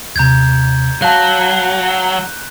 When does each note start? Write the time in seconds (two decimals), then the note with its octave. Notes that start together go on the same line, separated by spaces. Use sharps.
0.16 D#2 C3 A#5 G6 G#6
1.02 F#3 F5 A5 F#6